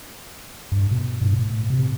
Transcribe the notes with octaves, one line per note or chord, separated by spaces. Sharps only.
G2
B2
G2
A2
C3